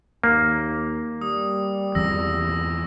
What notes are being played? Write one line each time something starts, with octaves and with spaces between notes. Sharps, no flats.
D#2 A#3
G3 D#6
E2 E3 C4 E6 A#6